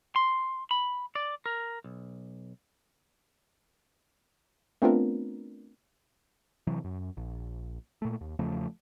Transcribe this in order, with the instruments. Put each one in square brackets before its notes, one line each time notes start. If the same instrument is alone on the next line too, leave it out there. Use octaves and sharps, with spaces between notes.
[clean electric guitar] C6
B5
D5
A#4
B1
[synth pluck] A3 B3 C4 D4 F4 A#4
[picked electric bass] C3 E3 F#3
F#2
A#1
A#2 A3
D#2
E2 C#3 F3 A3